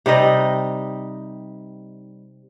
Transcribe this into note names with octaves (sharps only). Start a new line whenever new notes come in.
C3 G3 D#4 D#5